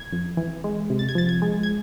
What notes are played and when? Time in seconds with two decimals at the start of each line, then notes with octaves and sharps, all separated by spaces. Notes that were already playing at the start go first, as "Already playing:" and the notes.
Already playing: G#6
0.13 F2
0.37 E3
0.64 G#3
0.90 C3
0.99 A6
1.09 G#6
1.15 F3 A6
1.29 G#6
1.42 G#3
1.63 G#6